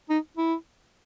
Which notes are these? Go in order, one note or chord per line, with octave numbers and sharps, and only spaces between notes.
D#4
E4